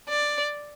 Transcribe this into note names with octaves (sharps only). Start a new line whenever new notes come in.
D5